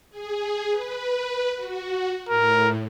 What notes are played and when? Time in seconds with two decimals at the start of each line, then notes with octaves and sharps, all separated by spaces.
0.10 G#4
0.70 B4
1.55 F#4
2.29 A2 A#4